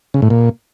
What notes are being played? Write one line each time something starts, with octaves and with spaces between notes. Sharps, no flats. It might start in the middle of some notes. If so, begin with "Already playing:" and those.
C#3
A2
A#2